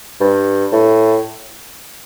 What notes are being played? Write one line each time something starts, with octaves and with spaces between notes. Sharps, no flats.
G2
A2